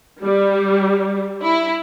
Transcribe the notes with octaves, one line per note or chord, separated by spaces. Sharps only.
G3
E4